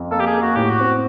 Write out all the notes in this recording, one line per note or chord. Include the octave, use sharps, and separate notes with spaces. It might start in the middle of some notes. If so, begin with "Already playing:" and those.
Already playing: F2
A#3 A4
G4
G#4
A#3
F#4
A2 G4
F#4
C4